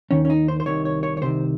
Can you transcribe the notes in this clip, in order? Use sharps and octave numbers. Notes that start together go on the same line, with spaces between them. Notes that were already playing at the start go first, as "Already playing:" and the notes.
D#2 D#3 C#4
C#4
D#4
C5
C5
C2 C3 D#3 C#5
C#5
C#5
C#5
C2 C3 D#3 C5